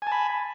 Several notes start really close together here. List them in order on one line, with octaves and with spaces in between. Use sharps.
G#5 A5 B5